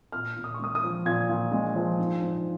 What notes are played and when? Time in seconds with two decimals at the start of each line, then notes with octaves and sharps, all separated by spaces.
0.12 A#2 F6
0.36 A#2
0.44 D#6
0.54 C#6
0.59 G#3 D#6
0.75 D#6
0.83 F3
1.05 A#2 G#6
1.29 A#2
1.52 G#3
1.75 F3
1.99 G#2
2.21 G#2